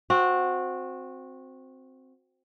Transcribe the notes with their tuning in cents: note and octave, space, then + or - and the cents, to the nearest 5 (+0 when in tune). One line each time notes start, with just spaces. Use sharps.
C4 +0 F#4 -20